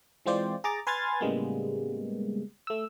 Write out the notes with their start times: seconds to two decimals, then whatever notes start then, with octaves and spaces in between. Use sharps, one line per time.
0.26 E3 G#3 C4 F4 C5 D5
0.64 G#4 A#5 D6 A6
0.87 B4 G#5 C6 F6 G#6 A6
1.21 A2 C#3 G3 G#3 A#3 B3
2.67 A3 E6